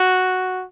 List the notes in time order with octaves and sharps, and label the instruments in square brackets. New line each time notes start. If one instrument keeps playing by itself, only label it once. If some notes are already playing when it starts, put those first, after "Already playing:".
Already playing: [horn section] F#4